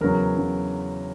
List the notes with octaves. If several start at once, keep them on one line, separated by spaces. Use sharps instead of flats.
E2 C#3 F#3 A#4
C#3 F#3